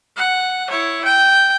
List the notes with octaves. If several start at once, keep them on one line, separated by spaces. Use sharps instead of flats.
F#5
E4 C#5
G5